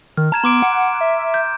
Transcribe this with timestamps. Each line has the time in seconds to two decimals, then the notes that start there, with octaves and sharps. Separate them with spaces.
0.17 D#3 F6
0.32 A5 A#5 G#6 E7
0.44 B3 C6 D6 D7
0.62 F#5
1.01 E5
1.34 G6